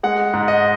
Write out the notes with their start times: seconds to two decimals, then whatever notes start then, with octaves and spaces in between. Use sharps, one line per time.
0.03 G#3 F#5
0.33 G#2
0.48 D#5